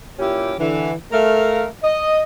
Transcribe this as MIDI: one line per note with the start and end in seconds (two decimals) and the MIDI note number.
0.19 0.53 46
0.19 0.53 61
0.19 0.53 64
0.19 0.53 67
0.59 0.92 50
0.59 0.92 52
1.12 1.66 57
1.12 1.66 70
1.12 1.66 77
1.84 2.22 75